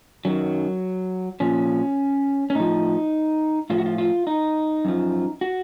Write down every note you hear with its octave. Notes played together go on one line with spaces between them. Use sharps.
F#2 D#3 F#3
A#2 F3 C#4
C#4
A2 F3 D#4
A2 F3 F4
F#4
F4
F4
D#4
F#2 F3
F#4